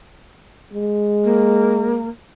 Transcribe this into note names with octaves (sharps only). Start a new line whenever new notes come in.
G#3
A#3